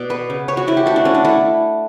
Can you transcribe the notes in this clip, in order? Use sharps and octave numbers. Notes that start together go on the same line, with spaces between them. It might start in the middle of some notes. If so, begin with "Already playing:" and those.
Already playing: B2 D5
B3 B4
C#3
C#3 C#5
F#4
C#3 E4
G4
A3 F#4
D4
A3 C#4
D4
A3 E4